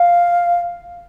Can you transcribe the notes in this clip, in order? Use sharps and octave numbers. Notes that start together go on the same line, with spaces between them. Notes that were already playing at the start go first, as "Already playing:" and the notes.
Already playing: F5